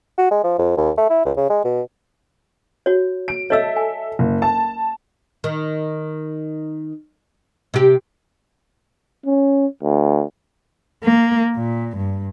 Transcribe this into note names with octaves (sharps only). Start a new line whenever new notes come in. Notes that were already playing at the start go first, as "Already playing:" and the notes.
F#4
G#3
F3
F2
D#2
A3
E4
C#2
C#3
G#3
B2
F#4 C#5
D7
A4 C#5 D#5 E5 E6
G#5
F#1
A5
D#3
C3 G4
C#4
D2
A#3
A#2
G2